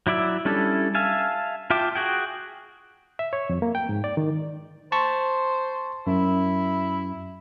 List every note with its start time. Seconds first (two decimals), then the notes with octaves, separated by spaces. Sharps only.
0.07 F#3 E4 D5 E5
0.45 G3 C#4 D4 E4 A4
0.95 E5 F5 G#5 A5
1.70 F4 E5 G5 A5 D6
1.95 F#4 G#4 G5
3.19 E5
3.33 C#5
3.50 F2
3.62 A#3
3.75 G5
3.89 G#2
4.04 D5
4.17 D#3
4.92 C5 A5 C#6
6.07 F#2 E4